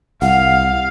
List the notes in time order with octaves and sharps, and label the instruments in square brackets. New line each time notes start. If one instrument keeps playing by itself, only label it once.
[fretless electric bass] C2 [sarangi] F5 [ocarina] F#5